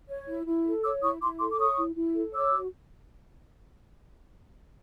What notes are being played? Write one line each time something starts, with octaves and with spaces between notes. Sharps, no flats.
C#5
E4
E4
A4
C#5 D6 E6
E4 C#6 D#6
E4 C6 D6
A4 C6 D6
D6
C#5 C#6 D#6
E4
E4
A4
C#5 D6 E6
F#4